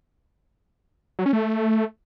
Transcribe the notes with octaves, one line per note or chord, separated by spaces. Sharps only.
F#3
C#4
A3